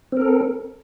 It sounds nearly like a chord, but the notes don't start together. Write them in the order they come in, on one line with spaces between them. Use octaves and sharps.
C4 A#4 A4